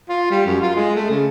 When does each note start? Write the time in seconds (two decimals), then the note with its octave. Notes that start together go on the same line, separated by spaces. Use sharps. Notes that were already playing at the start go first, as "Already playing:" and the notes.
0.09 F4
0.30 G3
0.46 F#2
0.61 F4
0.76 G#3
0.95 A3
1.10 C#3